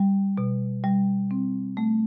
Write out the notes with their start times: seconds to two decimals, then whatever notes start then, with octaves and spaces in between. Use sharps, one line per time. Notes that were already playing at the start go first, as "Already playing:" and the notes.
Already playing: G3
0.38 B2
0.84 G3
1.31 C4
1.77 A3